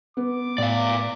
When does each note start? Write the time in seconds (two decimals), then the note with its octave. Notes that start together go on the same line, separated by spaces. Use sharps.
0.17 B3 B4 D6
0.58 A2 D5 F5